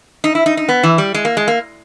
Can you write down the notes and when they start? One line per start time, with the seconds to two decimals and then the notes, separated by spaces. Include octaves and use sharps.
0.24 D#4
0.35 E4
0.46 D#4
0.57 D#4
0.69 B3
0.83 E3
0.98 G3
1.14 G#3
1.25 A#3
1.37 G#3
1.48 A#3